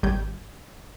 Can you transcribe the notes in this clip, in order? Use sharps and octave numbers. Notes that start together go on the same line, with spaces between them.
G#1 G3 G4 C#5 G6 G#6